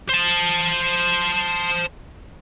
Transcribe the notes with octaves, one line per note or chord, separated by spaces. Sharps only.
C5 A5